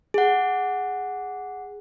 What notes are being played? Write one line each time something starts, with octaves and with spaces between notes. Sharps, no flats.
G#4 F#5